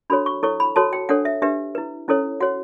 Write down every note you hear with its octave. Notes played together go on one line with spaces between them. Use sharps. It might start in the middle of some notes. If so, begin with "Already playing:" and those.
D4 F#4 A4 C#5 B5
C#6
E4 A4 C#5 C#6
B5
F#4 A4 C#5 A5
G5
D4 A4 C#5 F#5
E5
D4 G4 B4 E5
E4 B4
C#4 E4 A4 C#5
F#4 C#5 F#5